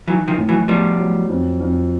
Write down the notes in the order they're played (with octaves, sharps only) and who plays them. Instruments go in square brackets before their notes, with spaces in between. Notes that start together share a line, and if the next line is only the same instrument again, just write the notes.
[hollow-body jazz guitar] E3 F#3 [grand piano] D#4
[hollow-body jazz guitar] D#3 F3
[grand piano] A2
[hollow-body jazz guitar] E3 F#3
[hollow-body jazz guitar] F3 G3 [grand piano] B3
[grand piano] F#3
F2
F2